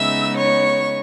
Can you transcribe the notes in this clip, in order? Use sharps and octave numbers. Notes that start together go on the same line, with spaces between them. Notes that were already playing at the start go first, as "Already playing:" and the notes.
Already playing: C#3 G#3 B3 D#4 E5 E6
C#5 C#6